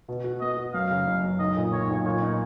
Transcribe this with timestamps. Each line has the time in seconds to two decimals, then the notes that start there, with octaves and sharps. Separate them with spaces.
0.08 B2
0.24 F#4
0.41 B3 D#5
0.57 F#4
0.74 F#2 F5
0.91 C#3
1.07 F#1
1.23 F#2
1.39 B1 D#5
1.56 A#2
1.72 B1 C#5
1.90 B1
2.05 A#2 C#5
2.22 D#4